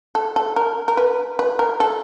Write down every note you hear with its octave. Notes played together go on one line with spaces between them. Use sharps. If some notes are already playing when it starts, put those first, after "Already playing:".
A4
A4
A#4
A#4
B4
B4
A#4
A4